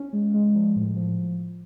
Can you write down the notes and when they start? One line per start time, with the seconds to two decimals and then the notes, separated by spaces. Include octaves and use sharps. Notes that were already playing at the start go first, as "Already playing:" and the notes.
Already playing: C#4
0.13 G#3
0.34 G#3
0.55 F3
0.76 A2
0.96 F3